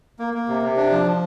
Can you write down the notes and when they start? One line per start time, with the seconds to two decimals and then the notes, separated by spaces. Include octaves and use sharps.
0.19 A#3
0.34 A#3
0.49 C3
0.62 C3
0.77 D4
0.91 F3
1.06 F3